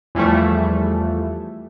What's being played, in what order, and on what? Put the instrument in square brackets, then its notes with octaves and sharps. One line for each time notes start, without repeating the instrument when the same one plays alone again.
[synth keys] E2 E3 F3 G3 A3